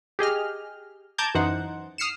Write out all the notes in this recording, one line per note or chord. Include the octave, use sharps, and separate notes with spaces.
G4 G#4 D#5 F6
A5 A#5 D6 G6 G#6
F#2 E3 D#4 C5 F#5
D#6 F6 C7 C#7 E7